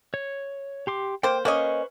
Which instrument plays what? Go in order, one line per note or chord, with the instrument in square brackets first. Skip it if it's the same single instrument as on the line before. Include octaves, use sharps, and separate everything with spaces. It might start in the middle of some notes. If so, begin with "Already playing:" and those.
[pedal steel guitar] C#5
G4 C6 D6
[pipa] A#3 C5 [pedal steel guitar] G5
[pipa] A#3 C#4 D#5 [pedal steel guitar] B4 C5 C#6